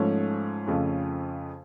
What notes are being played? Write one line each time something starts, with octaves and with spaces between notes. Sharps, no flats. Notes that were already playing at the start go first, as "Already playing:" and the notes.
Already playing: G#2 F3 A3 C#4
F2 C#3 F3 A3